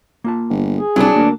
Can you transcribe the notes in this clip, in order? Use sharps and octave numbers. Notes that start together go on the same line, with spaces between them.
A#3 F4 A5
G1
G#4
C2 F#3 D4
D2 A#3 A#4